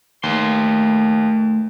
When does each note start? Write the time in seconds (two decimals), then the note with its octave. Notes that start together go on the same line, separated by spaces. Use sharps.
0.23 D#2 A3 B4 C6